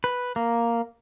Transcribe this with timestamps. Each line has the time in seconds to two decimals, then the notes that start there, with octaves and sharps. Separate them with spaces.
0.04 B4
0.36 A#3